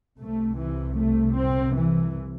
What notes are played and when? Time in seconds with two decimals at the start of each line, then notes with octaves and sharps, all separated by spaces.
0.20 C2 C3 A3
0.59 E3
0.97 A3
1.36 C4
1.76 E3